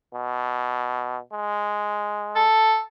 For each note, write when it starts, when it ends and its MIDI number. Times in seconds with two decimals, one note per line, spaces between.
0.14 1.18 47
1.32 2.45 56
2.36 2.80 69